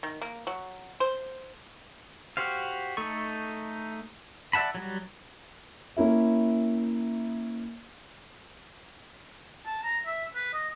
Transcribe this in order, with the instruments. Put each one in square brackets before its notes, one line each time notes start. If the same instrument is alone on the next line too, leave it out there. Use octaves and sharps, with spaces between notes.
[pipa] D#3
A#3
F#3
C5
[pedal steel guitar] F#4 G4 C5 F5
A3 D#4 A4 C#6
D5 E5 F#5 A5 B5
F#3 G3 F#4
[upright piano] A#3 C#4 E4 E5
[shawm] A5
A#5
E5
B4
D#5